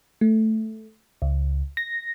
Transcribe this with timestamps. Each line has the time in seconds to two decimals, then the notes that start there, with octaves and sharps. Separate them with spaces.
0.21 A3
1.22 C#2
1.77 A#6